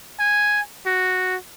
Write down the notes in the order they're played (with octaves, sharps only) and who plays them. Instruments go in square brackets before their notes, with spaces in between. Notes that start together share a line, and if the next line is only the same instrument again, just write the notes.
[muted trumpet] G#5
F#4